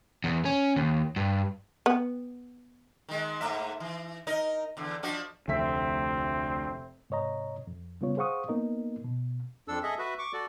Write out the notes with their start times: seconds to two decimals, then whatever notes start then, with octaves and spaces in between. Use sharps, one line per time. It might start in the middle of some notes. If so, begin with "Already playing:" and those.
0.24 E2
0.45 C#4
0.76 D#2
1.16 G2
1.86 B3
3.09 D#3 G#3
3.41 G#2 A3 E5
3.80 E3
4.27 D#4 A#4 D#5
4.77 E2 D3
5.03 F3 D4 F#4
5.48 F1 D2 C4 E5 B6
7.10 G#2 C3 C#5 D#5 A#5
7.67 F2
8.01 C#3 G3 B3 F4 C#5
8.17 G#4 C5 F5 F#5 C#6 D#6
8.48 A#3 B3 D#4 A#4 D#5
9.04 B2
9.68 F2 D4 A4 E6
9.83 G#4 A4 D#5 E5
9.99 F#4 B4 E5
10.19 C#6 D6
10.33 F#4 A4 D5